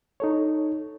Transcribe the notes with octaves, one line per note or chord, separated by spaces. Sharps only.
D#4 A4 C#5